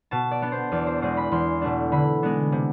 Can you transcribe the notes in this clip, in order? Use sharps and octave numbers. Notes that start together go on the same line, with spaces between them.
B2 A5
D5
B3 D4
C5
E2 D5
C5
B2 G#3 C5
B5
E2 C6
B2 A3 D4
D3 B5
G#3 B3 D4
C3